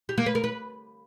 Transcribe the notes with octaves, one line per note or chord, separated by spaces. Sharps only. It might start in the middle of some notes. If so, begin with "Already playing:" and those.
G4
A#3
B4
A#4
B4